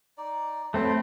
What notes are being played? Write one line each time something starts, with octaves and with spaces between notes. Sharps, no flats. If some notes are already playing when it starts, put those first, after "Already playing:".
D#4 D5
F#3 A3 C4 B4